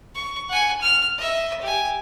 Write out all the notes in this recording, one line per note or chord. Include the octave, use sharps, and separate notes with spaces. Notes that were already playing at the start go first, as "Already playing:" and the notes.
C#6
F#5 G#5
F6
D#5 E5
G4 G#5